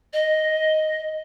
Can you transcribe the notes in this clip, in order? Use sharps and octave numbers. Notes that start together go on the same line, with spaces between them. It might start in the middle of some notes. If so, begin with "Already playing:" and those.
D#5